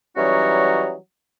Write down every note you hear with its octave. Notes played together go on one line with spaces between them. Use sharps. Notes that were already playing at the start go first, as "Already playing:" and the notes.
E3 F#3 G3 C#4 D#4 F#4